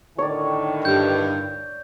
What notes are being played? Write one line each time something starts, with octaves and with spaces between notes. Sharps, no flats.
A2 D3 D#3 C#5 D5
G2 G6